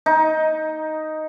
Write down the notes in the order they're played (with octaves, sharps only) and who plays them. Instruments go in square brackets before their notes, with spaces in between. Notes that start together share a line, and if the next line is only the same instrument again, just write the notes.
[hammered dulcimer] D#4